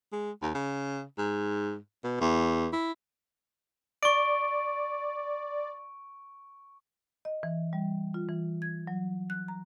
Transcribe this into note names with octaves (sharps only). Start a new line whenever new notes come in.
G#3
D#2
C#3
G#2
B2
E2
E4
D5 C#6 D7
D#5
E3
G3
F4
E3
G#6
F#3
F#6
A#5